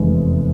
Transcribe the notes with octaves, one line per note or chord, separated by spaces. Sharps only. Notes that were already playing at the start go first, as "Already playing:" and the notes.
Already playing: F1 E2 C3 G#3 B3